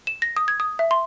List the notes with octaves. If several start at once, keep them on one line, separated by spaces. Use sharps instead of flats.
E7
A#6
D#6
G#6
D#6
E5
C6